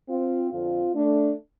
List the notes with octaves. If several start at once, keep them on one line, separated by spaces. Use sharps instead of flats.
C4 F4
F2 D3 C4 F4
A3 D4